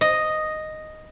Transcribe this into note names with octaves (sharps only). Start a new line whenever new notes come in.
D#5